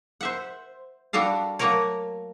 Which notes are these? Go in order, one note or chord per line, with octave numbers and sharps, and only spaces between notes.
C5 E5 F#5
G3 D4 F#4 A4 F5
F#3 A3 A#3 F#4 A#4 C#5